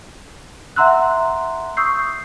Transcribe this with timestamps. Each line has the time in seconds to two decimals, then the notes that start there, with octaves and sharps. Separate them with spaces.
0.76 E5 F#5 A#5 C6 E6 F#6
1.77 C#6 D#6 E6 G6 C7